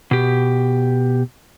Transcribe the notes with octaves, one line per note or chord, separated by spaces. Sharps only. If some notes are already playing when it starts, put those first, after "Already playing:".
B2 G4